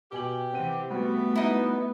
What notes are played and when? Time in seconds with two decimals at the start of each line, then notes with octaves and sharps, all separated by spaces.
0.12 B2 G4 G#5 F#7
0.53 C3 E3 C4 F#5 D#7
0.90 G3 A3 B3 F#4
1.36 D#4 E4